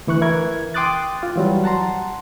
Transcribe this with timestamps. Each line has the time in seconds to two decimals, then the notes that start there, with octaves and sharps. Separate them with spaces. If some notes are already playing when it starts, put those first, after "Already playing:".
0.07 D2 E3 C#6 F#6
0.21 E3 E4 A#4 G#6
0.74 G5 C6 D6 D#6 F#6 A6
1.23 F4
1.36 E3 F#3 G3
1.64 F#5 A5 A#5 C6